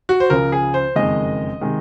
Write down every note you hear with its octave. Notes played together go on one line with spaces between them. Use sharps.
F#4
C5
C#2 C#3 F3 A#4
G#4
C5
F#1 F2 D#3 G#3 D#5
C3 D#3 G#3